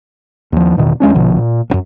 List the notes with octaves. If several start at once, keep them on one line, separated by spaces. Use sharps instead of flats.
D#2 F3
A1 E2 B2 D#3
E2 G#3 C#4 D4
A#1 B2 D3 F3
A#2
A1 F#2